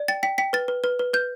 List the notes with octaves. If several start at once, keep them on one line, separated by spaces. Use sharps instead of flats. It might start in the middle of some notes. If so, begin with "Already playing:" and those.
Already playing: D5
G5 A6
G5 B6
G5 B6
B4 A6
B4
B4
B4
B4 G6